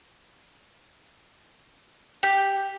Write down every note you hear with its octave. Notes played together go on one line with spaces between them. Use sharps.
G4